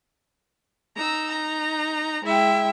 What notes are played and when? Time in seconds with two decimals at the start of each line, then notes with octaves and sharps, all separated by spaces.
0.97 D#4 A#5 E6
1.30 A#5
2.25 G#3 E4 E5 G5